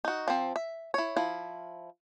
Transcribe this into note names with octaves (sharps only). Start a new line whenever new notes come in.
D#4 F#4
F3 C4
E5
E4 C#5
F3 E4